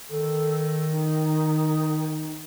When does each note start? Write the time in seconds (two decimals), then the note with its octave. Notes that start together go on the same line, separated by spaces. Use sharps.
0.10 D#3 A4
0.92 D#4